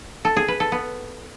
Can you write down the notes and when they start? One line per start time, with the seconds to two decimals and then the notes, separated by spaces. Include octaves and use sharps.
0.25 A4
0.36 G#4
0.48 B4
0.60 A4
0.72 B3